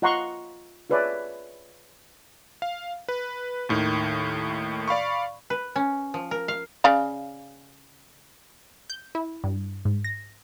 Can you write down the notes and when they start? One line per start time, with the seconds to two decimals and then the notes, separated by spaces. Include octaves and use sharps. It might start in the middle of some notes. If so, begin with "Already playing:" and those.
0.02 F4 D#5 F#5 A#5 C6 C#6
0.90 F4 G#4 B4 C#5 D5 E5
2.62 F5
3.09 B4
3.69 D#2 A2 D#3
4.88 D5 F5 B5 C#6
5.50 B4
5.76 C#4
6.14 F3
6.31 A#4
6.48 F5
6.84 C#3 D5 F5
8.90 G6
9.15 E4
9.44 G2
9.85 G#2
10.04 A#6